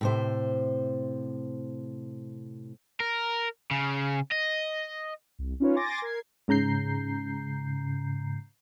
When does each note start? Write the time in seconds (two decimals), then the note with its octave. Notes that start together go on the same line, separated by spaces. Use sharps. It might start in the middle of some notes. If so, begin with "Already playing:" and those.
0.01 A2 C3 C5
3.00 A#4
3.71 C#3
4.32 D#5
5.39 C2
5.60 C#4 D#4 F4 B4 C#5
5.76 G#5 C6 D6 A6 A#6
6.02 A#4 G#6 C7
6.48 G#2 C#3 A#5 G6 C7